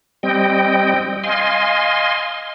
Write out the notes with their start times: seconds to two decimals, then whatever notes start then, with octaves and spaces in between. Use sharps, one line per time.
0.23 G3 C4 D#5 G5
1.24 D#5 F5 G#5 C6